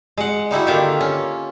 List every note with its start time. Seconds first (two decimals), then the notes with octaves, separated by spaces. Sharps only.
0.17 G#3 F#5
0.51 G3 D#4 E4 F#4
0.67 D3 D#3 A#3 F4 G4 E5
1.01 C#4